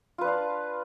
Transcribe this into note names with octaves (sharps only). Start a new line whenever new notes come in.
D4 F4 B4 F5